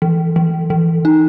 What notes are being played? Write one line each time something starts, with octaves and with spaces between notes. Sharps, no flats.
E3
E3
E3
D#4